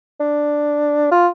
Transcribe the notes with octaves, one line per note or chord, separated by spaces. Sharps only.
D4
F4